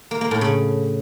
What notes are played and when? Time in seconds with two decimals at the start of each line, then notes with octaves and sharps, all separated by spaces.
0.11 A#3
0.21 A#3
0.31 A2
0.41 C#3